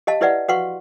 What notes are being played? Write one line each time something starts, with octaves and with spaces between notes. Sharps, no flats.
G4 D#5 F5 A5
E4 G4 B4 D5 E5 F#5
F#4 B4 F5 F#5 C6 C#6